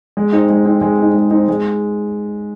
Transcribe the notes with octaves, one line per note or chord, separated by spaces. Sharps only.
G#3
C4 D#4
G#3
C4 D#4
G#3
C4 D#4
G#3
C4 D#4
G#3